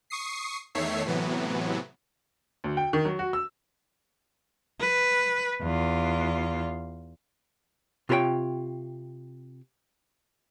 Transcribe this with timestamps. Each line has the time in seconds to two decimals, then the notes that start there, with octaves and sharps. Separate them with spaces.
0.10 C#6 D#6 C7
0.75 E2 D#3 A3 C#5 E5 C7
1.05 A2 C3 E3 F#3 B3
2.64 D2
2.77 G5
2.93 D#3
3.05 F#3
3.19 F#4
3.33 E6
4.81 B4
5.62 E2 F4
8.09 C3 F4 F#4 A#4 C#5 G5